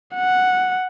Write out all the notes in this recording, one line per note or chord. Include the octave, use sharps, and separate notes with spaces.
F#5